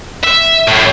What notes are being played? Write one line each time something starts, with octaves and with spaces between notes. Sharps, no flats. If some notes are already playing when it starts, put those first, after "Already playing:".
E5
F#2 A2